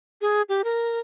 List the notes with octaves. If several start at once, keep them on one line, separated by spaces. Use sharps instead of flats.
G#4
G4
A#4